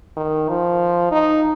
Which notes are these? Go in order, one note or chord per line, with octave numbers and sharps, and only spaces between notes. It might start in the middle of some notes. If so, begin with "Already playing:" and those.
D#3
F3
D#4